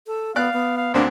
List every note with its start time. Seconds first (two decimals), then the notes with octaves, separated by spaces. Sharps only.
0.07 A4
0.36 B3 D5 F5 D6 F#6
0.53 B3
0.77 F5
0.94 D2 A#3 C4 D4